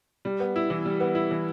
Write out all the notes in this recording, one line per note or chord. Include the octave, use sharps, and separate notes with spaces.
G3
B3
E4
E3
G3
B3
E4
E3